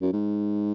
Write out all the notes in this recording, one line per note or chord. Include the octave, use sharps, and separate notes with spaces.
F#2
G#2